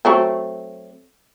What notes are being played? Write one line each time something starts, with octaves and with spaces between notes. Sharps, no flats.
F#3 A3 C4